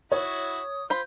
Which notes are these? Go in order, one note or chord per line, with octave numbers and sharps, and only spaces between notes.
E4 F#4 C#5 D#6
F4 C5 B5 G6